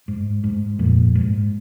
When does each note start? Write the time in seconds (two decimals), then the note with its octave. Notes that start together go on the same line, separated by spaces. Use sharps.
0.08 G#2
0.44 G#2
0.79 F2 A#2
1.15 G#2